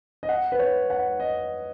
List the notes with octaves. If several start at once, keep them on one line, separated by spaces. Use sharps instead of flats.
D#5
F#5
B4
C#5
F#5
D#5